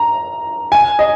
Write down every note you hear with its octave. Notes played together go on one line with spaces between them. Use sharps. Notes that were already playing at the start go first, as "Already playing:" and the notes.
Already playing: A#5
G#5
D#5